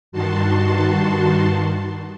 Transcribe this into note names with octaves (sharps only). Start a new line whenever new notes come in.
G2 D#3 F#4 A5 C6